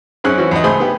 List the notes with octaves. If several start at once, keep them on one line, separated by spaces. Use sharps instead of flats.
F#2 C4 C#4 G#4 F#6
E3 C4 C#4 F#4
E2 D#5
C#2 A3 G#4 C5 B5 D#6
B3 G4